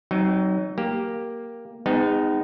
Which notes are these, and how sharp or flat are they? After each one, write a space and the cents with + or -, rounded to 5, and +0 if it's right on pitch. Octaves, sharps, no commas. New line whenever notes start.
F#3 +30 C4 +0 D#4 +0
A#3 +0 G4 +0
G#3 -30 B3 +40 D#4 +0